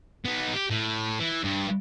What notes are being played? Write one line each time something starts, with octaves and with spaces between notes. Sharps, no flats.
B3 D#4
G4
A2
E3
G2